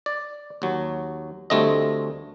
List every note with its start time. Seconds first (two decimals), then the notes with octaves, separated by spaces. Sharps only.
0.06 D5
0.62 D#2 F#3
1.50 D2 G3 A3 C4 D#5